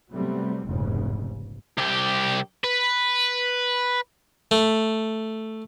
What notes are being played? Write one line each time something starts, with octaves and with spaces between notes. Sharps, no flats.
C3 F#3 G3 A3 B3 C4
F1 A#1 E2 G#2 C#3
C2 G4
B4
A3